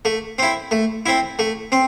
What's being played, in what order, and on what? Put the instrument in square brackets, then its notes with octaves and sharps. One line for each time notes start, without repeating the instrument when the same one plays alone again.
[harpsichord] A3
C4 E4
A3
C4 E4
A3
C4